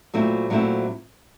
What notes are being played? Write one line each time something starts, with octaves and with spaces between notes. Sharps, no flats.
A#2 F#3 A3 C4 E4
A#2 F#3 A3 C4 E4